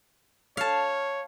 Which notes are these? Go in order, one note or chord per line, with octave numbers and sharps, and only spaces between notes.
C#5 F5 A5